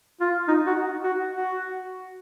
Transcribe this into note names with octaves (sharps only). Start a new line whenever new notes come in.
F4
D#4
F#4
F#4
F#4